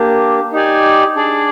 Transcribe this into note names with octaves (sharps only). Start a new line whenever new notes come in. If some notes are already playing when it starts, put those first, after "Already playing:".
Already playing: A#3 D4 G4
D#4 G4 D5 G#5
D4 G#4 D5